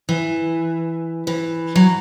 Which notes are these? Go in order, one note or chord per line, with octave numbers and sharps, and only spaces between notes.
E3
E3
F#3